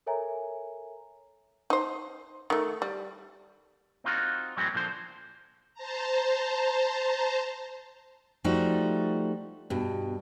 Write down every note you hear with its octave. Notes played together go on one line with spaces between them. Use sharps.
A4 A#4 C#5 E5 G#5 A#5
D#4 C5
D#3 A3
G3
C4 D#4 F4 F#4
A2 E3 F#3 G#3 C4 C#4
A#2 D3 F3 C5
C5 A5 A#5
F3 G3 A3 D#4 F#4
G2 B2